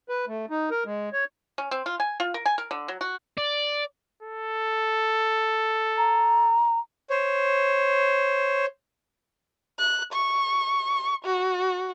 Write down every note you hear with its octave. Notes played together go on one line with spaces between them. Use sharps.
B4
A3
D#4
A#4
G#3
C#5
C#4
C4
F4
G#5
F4
A#4
G#5
A#4
D3
F#3
F#4
D5
A4
A#5
C5 C#5
F#6
C#6
F#4